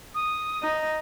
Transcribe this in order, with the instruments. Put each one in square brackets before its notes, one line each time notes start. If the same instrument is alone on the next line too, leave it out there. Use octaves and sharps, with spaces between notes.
[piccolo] D#6
[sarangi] D#4